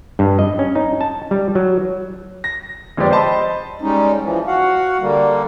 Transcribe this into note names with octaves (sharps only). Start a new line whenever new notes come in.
G2
D#5
C#4
D#4
A5
G3
F#3
A#6
F2 G#3 B3 C4 G4 D5
C5 D#5 A5 B5 C6
G3 G#3 C#4 D#4
E3 F3
F#4 F5 F#5
D3 G3 A#3